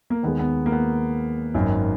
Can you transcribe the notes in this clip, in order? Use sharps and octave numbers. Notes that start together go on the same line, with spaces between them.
A#3
D#2 D#3 G#3 B3
B3
A#3
B3
G#1 F#2 D#3